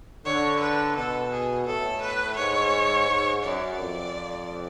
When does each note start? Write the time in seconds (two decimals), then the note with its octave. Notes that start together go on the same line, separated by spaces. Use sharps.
0.25 D3 C#5
0.60 B4
0.96 B2 A4
1.32 G#4
1.66 A2 A4
2.02 B4
2.37 G#2 C#5
3.08 G#2
3.43 F#2 D5
3.79 F2